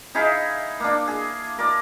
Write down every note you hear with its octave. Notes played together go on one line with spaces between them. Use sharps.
D#4 E4 G#4 F5
A#3 D4
G#4
A#4 D5